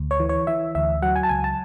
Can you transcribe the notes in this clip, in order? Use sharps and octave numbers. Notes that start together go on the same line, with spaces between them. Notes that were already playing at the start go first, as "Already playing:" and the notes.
Already playing: D2
C#5
E3
C#5
E3 E5
D2 E5
F#3 F#5
G#5
A5
C#2 G#5
A5